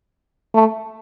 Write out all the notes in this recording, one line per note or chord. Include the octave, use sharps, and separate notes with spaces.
A3